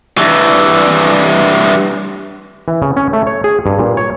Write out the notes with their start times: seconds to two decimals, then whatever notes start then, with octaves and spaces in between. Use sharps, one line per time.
0.18 G2 E3
2.68 E3
2.82 C#3
2.97 C#4
3.13 A3
3.27 C#5
3.44 G#4
3.66 G2
3.79 A#2
3.97 C#5